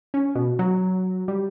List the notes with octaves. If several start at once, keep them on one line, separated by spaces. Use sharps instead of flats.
C#4
B2
F#3
G3